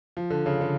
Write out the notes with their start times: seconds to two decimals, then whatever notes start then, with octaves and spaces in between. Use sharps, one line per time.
0.17 F3
0.30 D3
0.46 C#3
0.61 D3